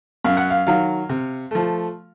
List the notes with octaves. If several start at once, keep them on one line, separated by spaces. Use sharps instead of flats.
F#2 F5
F#5
F5
D#3 F#3 F5
C3
F3 A3